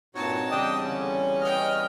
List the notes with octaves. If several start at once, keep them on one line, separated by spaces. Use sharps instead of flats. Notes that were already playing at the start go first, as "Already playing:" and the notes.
G2 A#2 C4 D#4 F#4 C#5 A5
E2 C#3 G3 D4 D#5 G5 D#6
D3 C#4
B4 D#5 G5 F6